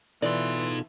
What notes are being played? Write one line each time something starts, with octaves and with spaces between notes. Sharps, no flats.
B2 E3 D#4 F4 A4 D5 C6